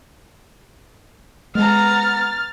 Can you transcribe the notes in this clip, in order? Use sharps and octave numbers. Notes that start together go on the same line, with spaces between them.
G#3 B3 A#5 F6 A6